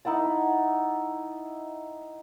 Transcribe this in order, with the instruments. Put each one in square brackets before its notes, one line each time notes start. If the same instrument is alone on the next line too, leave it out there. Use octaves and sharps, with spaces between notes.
[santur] D#4 E4 F#5 A5